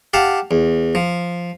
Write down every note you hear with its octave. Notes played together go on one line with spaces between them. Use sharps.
G4 F5 F#5 A5
E2
F3